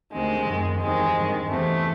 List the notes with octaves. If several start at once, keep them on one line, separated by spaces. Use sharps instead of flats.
D2 C3 D#3 G#3
F#2 D#3
E2 C3 D#3 G#3
G2 D#3
E2 C3 E3 A3